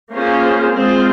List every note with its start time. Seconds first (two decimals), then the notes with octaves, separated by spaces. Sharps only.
0.14 A#3 C#4 F4 G#4 C5
0.73 G#3 C4 F4 G#4 C5